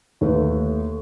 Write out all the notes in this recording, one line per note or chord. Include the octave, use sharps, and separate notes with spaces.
D#2 A3 B4